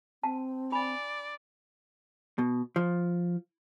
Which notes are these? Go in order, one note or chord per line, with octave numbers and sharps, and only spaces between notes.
C4 A5
D4 D5 B5
B2
F3